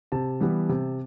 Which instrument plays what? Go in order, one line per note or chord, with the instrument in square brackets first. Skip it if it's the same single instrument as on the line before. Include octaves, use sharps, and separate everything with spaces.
[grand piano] C3 A5
E3 G3 B3
C3